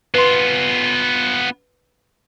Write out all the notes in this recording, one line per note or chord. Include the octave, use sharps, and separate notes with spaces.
B3 F4 B4 C6